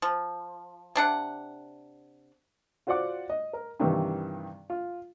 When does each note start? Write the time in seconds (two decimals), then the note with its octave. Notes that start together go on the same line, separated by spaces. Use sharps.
0.02 F3
0.95 C3 D4 F#5
2.87 F4 F#4 C5 D5 F#5 D6
3.29 D#5
3.53 A#4
3.80 G2 C3 D#3 E3
4.70 F4